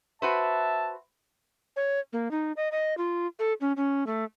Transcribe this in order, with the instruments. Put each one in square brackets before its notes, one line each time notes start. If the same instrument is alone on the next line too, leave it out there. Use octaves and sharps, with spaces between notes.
[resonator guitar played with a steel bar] F#4 B4 C5 [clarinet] E5 [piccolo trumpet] A5
[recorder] C#5
A#3
D#4
D#5
D#5
F4
A4
C#4
C#4
A3